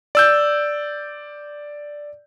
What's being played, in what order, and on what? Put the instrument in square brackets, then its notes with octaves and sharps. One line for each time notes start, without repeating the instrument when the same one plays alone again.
[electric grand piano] D5 E6 G6